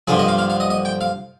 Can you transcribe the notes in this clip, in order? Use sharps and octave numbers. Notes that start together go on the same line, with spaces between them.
G2 D3 F3 G#4
D#5
F5
F5
F5
D#5
D#5
G5
F5